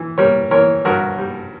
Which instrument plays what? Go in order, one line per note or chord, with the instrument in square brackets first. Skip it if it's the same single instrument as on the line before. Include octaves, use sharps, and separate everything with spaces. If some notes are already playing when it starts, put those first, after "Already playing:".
Already playing: [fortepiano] E3
G3 A#4 C#5
E3 A#4 C#5
G2 F#4 A#4
G3